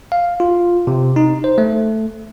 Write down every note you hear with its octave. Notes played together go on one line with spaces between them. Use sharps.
F5
F4
C3
D#4
C5
A3